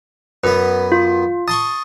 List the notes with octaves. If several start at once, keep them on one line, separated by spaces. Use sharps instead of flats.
F#2 B3 B4
F4
A5 C6 C#6 D#6